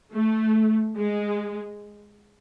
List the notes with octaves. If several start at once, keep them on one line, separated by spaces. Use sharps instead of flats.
A3
G#3